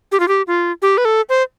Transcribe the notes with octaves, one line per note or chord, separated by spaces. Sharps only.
G4
F4
G4
F4
G4
B4
A4
C5